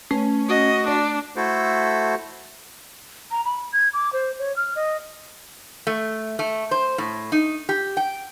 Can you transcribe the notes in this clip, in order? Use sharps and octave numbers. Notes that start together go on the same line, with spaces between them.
A3 C#4 B4
F#4 D#5
D4 D5
A3 E4 F#4 A4 C5
A#5
B5
G#6
D6
C5
C#5
F6
D#5
A3
A3
C5
A2
D#4
G4
G5